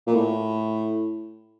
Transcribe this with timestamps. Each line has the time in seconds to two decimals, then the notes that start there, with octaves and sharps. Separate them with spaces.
0.07 A#2
0.15 A2